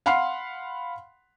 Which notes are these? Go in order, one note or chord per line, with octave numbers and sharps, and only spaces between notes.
F5 F#5 B5 C6 F6 C7